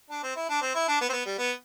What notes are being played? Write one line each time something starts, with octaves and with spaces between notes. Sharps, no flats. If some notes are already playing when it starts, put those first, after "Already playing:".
D4
C4
E4
D4
C4
E4
D4
B3
C4
B3
G3
B3